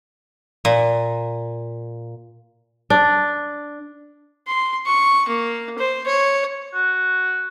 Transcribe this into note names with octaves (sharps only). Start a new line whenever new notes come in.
A#2
D4
C6
C#6
A#3
C5
C#5
F#4